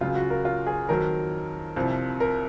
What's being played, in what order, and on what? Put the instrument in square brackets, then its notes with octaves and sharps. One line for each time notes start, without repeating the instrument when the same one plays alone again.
[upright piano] C#2 C#3 F#3 F4
F#4
A#4
F4
G#4
F2 D#3 F#3 A#4
C2 C3 F3
A#4